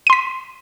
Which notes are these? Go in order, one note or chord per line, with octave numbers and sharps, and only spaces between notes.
C6 B6 D#7